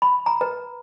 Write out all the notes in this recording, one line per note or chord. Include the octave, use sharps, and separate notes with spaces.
B5
A#5
B4